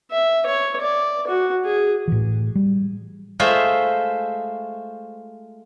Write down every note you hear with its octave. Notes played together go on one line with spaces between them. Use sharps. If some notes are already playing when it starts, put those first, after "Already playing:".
E5
C#5
D5
F#4
G#4
A2 E3
G3
G#3 A3 F4 C5 E5